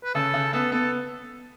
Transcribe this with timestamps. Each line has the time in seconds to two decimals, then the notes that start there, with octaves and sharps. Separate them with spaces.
0.04 B4
0.14 C#3 A4
0.34 C#3
0.53 B3 A4
0.72 B3 A4